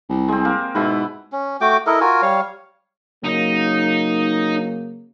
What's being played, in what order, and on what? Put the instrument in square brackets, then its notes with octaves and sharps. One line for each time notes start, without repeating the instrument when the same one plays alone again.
[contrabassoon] C2
[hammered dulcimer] G#3 C4
A#3
[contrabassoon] G#2 [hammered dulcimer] B2 E4 B4
[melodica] C#4
A3 F#4 G5 D6
E4 A4 A#4 D#5
F4 F#4 A#4 G#5
G3 C#5 F5
[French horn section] C#3 F#3 A#3 [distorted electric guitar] D#4